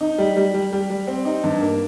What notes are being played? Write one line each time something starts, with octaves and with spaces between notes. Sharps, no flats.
D#4
G3
G3
G3
G3
G3
C4
D#4
G2
A#3